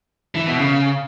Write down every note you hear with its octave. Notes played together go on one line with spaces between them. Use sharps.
E3
B2
C#3